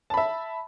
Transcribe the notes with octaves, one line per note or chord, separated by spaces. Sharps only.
E5 A5 B5